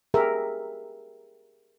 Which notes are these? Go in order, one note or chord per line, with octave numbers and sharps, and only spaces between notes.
G4 G#4 A#4 E5